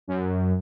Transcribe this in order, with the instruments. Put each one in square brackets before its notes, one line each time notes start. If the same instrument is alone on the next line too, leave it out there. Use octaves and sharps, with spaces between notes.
[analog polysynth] F#2